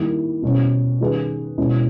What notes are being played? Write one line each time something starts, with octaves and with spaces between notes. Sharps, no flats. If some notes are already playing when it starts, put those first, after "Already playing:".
Already playing: D#3 G3 A#3 E4
B2 G3 C#4
D#3 G3 C#4 G#4 B4
B2 G#3 C#4 E4